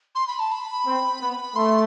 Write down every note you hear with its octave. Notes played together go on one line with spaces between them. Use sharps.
C6
B5
A5
B5
C4
B3
A3 C6